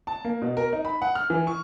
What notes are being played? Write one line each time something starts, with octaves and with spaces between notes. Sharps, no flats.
A5
A#3
B2
A#4
D#4
B5
F#5
F6
E3
C#6